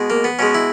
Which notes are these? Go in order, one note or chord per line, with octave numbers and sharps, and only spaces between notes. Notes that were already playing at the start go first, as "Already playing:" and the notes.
Already playing: B2 G#3
A#3
B3
B2 G#3 C#4
E4